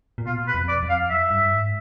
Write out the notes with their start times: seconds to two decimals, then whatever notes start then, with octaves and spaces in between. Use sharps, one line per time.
0.18 A#2
0.26 B2 F4
0.48 B4
0.54 F2
0.68 D5
0.83 F2
0.89 F5
1.10 F#2 E5
1.31 G2
1.52 G#2